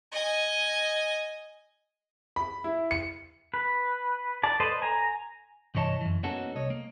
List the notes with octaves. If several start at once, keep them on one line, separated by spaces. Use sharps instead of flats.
D#5 G#5
B5
E4
C#7
B4
D5 A5
A4 B4 C5 D5 D#5
G#5 A#5
C2 G2 E3 C#5 D#5 A5
F#2 E3
A#3 B3 C#4 D#4 F#4 A4
C2 C#5 D#5
A#3